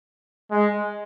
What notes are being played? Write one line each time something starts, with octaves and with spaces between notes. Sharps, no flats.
G#3